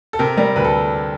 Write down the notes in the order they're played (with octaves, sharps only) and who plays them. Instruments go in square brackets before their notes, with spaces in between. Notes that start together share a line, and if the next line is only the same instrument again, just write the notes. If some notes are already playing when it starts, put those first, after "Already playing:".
[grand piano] A4
C3 A#4
G3 A#4
D2 B4
A4